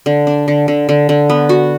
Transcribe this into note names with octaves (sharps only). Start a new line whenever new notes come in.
D3
D4
D3
D3
D3
D3
B3
F#4